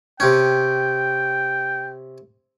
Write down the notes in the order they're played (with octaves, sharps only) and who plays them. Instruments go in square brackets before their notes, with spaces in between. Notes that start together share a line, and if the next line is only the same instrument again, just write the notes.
[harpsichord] C3 C#4 [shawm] G5